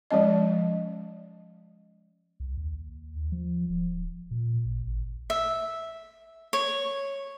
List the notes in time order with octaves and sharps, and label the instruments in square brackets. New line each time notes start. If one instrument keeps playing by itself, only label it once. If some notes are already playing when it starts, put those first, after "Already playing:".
[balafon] F3 G#3 C#4 D#5
[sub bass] C2
D#2
F3
D1
A#2
A1
G#1
[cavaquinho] E5
C#5